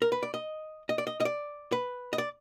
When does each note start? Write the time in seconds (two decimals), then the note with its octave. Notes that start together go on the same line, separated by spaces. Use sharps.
0.02 A#4
0.12 B4
0.23 D5
0.34 D#5
0.89 D#5
0.98 D5
1.07 D#5
1.20 D#5
1.25 D5
1.72 B4
2.13 D#5
2.18 D5